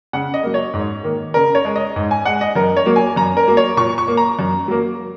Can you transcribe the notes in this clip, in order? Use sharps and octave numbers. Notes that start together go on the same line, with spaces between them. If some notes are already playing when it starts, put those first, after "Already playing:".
C#3 F#5
D#5
F#3 A#3
C#5
G#2
D#3 A#3
C#3 A#4
C#5
G#3
D#5
G#2
G#5
G#3 F#5
D#5
F#2 A#4
C#5
F#3 A#3
G#5
F#2 A#5
A#4
F#3 A#3
C#5
A#2 C#6
C#6
A#3
A#5
F#2
F#3 A#3